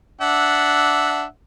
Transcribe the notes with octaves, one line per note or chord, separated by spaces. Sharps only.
D4 E5 F#5